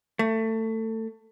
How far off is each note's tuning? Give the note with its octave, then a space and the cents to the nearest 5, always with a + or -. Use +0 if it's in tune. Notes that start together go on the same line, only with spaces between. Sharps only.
A3 +20